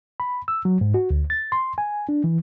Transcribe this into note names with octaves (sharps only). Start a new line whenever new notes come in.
B5
E6
F#3
G#2
F#4
D2
A6
C6
G#5
D4
E3